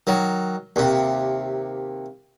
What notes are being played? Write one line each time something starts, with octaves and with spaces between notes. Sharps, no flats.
D#3 F#3
D#2 C3